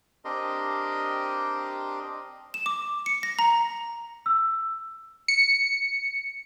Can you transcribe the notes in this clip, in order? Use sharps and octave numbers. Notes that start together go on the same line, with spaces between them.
C4 D4 G4 A#4 D#5 C6
E7
D6
C#7
A#6
A#5
E6
C#7